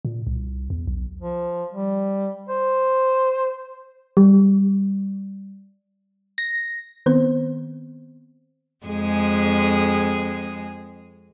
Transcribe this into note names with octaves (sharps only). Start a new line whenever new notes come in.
A#2
C2
E2
B1
F3
G3
C5
G3
A#6
D#3 B3 C4 C5
F2 G#3 G#4